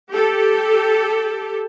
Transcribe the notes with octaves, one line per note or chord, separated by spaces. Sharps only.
G4 A4